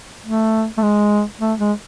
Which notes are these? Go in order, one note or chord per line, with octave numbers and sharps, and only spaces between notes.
A3
A3
G#3
A3
G#3